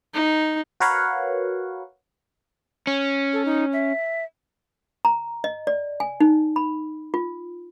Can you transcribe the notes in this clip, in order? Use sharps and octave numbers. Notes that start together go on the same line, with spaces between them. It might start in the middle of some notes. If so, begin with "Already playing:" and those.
D#4
F#4 A#4 B4 C#5 F5 F#5
C#4
A4
D#4
E5
A#5
D#5
D5
G#5
D#4
B5
F4